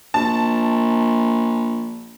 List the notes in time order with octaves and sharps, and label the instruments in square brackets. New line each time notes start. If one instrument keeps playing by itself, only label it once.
[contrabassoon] A#1 [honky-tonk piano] A5